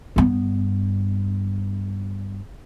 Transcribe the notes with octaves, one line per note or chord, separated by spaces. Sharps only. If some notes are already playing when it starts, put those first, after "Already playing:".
G2 B3